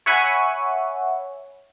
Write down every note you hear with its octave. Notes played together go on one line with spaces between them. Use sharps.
C#5 E5 F#5 G#5 B5 C#6